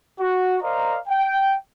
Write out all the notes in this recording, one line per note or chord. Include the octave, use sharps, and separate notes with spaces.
F#4
A#4 C5 D5 D#5 F5 A#5
G5